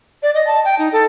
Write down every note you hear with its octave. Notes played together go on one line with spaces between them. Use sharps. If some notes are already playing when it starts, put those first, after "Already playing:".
D5
D#5
A5
G5
D#4
A4